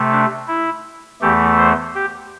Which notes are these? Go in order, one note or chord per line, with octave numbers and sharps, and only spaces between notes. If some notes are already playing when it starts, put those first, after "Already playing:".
Already playing: C3 A3
D4
E4
E2 E3 A3 G4
C5
G4